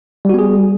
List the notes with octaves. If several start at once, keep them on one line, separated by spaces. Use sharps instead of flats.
G3 B3 F#4 G#4